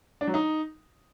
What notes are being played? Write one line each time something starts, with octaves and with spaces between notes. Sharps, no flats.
D4
F#3
D#4